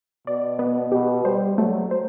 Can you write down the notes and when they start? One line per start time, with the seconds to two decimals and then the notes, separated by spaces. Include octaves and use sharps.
0.27 B2 D5
0.59 B3
0.92 B2 G4
1.25 G3 C5
1.58 F#3 A3
1.91 C5